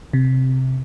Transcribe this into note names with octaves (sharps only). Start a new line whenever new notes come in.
C3